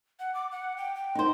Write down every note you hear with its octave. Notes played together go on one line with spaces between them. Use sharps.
F#5
D6
F#5
G5
G5
D#4 C5